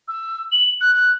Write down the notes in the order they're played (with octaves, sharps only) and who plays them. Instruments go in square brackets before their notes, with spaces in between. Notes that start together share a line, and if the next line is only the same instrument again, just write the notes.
[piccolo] E6
F#7
F#6
F#6